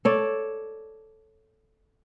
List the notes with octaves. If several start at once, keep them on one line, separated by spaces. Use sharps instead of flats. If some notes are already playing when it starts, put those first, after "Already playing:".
A4 C#5 D5